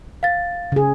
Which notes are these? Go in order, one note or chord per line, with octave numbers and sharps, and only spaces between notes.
F5 A6
C#3 G#4